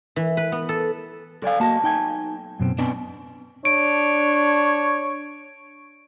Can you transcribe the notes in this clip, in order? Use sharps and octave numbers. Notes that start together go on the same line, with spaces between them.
E3
B4
B3
A4
F#2 A4 D5 F5 G#5
B1 A#3 F#4 D#5 A5
D#4 G5 G#5
F#2 B2 C4
B3 C4 D4
D4 C#5 D7